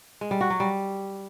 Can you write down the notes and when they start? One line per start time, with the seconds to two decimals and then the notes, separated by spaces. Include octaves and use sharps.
0.21 G#3
0.31 G3
0.41 F#4
0.50 F#3
0.60 G3